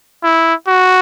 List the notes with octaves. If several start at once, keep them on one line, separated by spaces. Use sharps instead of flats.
E4
F#4